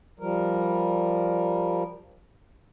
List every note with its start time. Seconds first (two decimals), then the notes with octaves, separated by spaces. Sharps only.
0.19 F3 G3 A#4